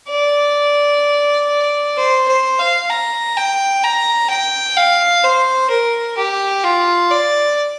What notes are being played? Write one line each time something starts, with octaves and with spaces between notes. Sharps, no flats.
D5
C5
C5
F5
A#5
G5
A#5
G5
F5
C5
A#4
G4
F4
D5